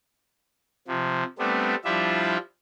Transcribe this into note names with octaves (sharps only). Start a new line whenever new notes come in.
C3 F3
G3 A3 B3 C4 D4
F3 G3 D4 E4 F4 E5